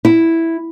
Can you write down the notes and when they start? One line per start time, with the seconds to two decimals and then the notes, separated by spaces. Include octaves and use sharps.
0.05 E4